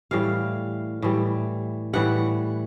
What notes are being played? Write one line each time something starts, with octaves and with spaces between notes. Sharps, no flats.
A2 E3 G3 F5
A2 E3 G3
A2 E3 G3 F#5